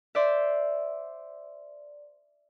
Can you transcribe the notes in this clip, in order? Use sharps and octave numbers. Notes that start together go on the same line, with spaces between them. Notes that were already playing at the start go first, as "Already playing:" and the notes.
C5 D5 E5